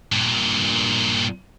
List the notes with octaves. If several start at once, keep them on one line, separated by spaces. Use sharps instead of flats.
G2 A#2